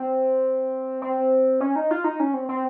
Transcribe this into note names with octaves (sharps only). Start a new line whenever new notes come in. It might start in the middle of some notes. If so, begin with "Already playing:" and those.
Already playing: C4
C4
C#4
D#4
F4
D#4
C#4
C4
C4